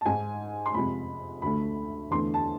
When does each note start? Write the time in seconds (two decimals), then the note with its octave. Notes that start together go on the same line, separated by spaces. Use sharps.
0.01 A5
0.06 G#2 G#3 G#5
0.66 C6
0.74 F2 C3 G#3 B5
1.42 D2 D3 A3 B5
2.11 E2 D3 A3 C6
2.34 A5